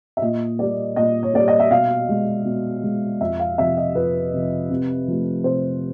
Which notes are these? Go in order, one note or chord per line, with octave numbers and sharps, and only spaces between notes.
E5
A#2 D#5
G3 A#3 D5
A#2 D#5
C#5
G3 A#3 D5
D#5
E5
B2 F5
G#3
B2
G#3
F2 E5
F5
C3 F3 E5
D#5
F2 B4
C3 F3
C3
F3 A3
C3 C5